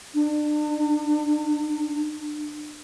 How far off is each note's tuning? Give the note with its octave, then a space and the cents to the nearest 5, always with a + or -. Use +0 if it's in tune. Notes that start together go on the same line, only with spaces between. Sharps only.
D4 +35